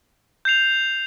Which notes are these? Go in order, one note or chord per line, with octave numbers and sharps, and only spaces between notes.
G6 C7 F7